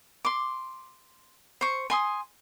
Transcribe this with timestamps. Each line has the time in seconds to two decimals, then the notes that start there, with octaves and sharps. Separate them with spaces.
0.25 C6 D6
1.61 C5 C#6
1.90 G#5 C6 D#6